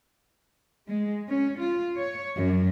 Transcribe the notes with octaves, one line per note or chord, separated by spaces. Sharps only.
G#3
C#4
F4
C#5
F#2